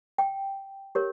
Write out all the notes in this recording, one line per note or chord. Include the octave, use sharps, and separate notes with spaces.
G5
G4 A#4 C#5